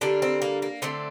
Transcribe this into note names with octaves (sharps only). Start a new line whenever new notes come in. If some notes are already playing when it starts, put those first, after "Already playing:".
D3 G3 A#3 D4
C4
A#3
A#3
D3 A3 C4